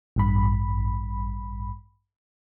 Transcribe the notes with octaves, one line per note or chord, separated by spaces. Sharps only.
A1 G2 B5